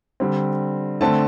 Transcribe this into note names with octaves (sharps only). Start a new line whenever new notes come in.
D3 G3 C4
D3 A3 C4 A5